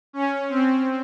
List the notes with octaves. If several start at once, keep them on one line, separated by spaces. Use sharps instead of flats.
C#4
C4